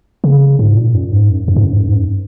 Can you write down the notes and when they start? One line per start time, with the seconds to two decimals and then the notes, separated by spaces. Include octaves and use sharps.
0.24 C#3
0.59 G#2
0.77 A#2
0.95 F#2
1.12 G#2
1.30 F#2
1.48 F#2
1.56 G#2
1.64 F#2
1.73 G#2
1.81 F#2
1.88 G#2
1.96 F#2